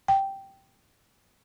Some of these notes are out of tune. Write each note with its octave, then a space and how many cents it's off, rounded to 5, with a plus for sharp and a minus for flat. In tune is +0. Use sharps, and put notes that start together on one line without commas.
G5 -5